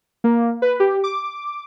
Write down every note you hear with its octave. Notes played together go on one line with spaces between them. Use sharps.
A#3
B4
G4
D6